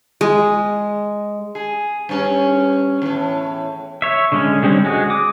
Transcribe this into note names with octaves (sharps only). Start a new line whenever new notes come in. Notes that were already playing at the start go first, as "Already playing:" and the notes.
G#3
G#4
G2 C#4
E2 A2
C#5 E5
D3 G#3 C#4
D3 G3 G#3 C4 C#4
G#3 F#4 G#4
D6 D#6